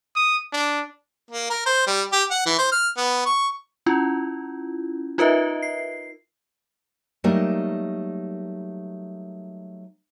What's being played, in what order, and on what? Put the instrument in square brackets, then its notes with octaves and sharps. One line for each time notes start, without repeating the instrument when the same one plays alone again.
[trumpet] D#6
D4
[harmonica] A#3
A#4
C5
G3
G4
F#5
E3
C5
F6
B3
C#6
[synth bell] C#4 E4 F4
D#4 F4 A#4 B4 D#5 E5
C7
[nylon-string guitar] F#3 G3 A3 A#3 D#4 A#4